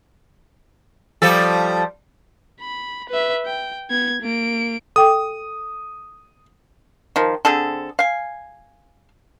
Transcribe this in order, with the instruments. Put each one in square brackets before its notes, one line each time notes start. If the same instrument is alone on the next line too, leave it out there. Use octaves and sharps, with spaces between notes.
[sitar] F3 G3 A4
[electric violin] B5
B4 E5
G5
B3 G#6
A#3 D7
[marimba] A4 G5 D6 [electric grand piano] D#6
[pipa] D#3 F3
D3 C4 G#4 A4
F5 G#5